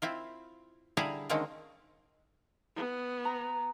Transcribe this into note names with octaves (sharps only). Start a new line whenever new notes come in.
C4 E4 F4
D3 G3 E4 G#4 F5 A#5
D3 D#3 G#3 A#3 C4 C#4
B3
A#5